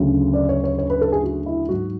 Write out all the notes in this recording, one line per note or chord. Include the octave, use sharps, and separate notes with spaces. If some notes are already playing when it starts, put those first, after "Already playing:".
Already playing: D2 C#3 F#3
D5
C#5
C#5
C#5
B4
A4
G#4
F#4
E4
G#2 F#3 F#4